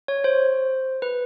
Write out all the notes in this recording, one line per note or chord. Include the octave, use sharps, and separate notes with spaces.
C#5
C5
B4